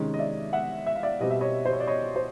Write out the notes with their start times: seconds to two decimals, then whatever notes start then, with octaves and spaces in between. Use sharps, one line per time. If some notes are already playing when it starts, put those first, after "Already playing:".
Already playing: C3 D#3 G#3 C#4
0.14 D#5
0.19 D5 E5
0.53 E5 F#5
0.86 E5
0.95 F5
1.03 D5 E5
1.20 B2 G3 C4 D#5
1.31 E5
1.41 C#5 D#5
1.66 C5
1.73 C#5
1.80 D5
1.87 C#5 D#5
2.16 C5